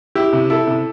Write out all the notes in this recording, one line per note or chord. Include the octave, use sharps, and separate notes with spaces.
E4 G4
C3
E4 A4
C3